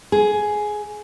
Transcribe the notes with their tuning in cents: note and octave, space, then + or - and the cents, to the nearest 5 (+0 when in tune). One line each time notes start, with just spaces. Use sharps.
G#4 +10